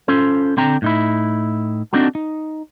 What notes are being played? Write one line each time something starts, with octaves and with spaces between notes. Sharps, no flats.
C#4 F4 A4 C5
D3 C4 G5 A#5
A2 D#4 E4
C4 D4 D#4 F#4 A4
D#4